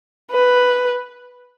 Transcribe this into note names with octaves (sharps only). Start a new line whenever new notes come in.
B4